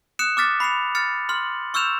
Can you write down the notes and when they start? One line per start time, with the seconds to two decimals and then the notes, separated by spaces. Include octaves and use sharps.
0.19 D#6 F#6 C#7 E7
0.37 D6 F6 A6 B6
0.60 B5 C7 C#7 F7
0.95 F6 A6 C#7
1.29 C6 F6 F#7
1.74 C#6 E6 F6 G6 E7 F7